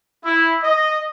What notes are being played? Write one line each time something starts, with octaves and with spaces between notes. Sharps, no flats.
E4
D#5